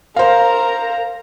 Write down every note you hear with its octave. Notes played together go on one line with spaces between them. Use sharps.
A#4 C5 F5 A#5